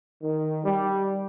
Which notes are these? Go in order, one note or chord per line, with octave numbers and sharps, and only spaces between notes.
D#3
G3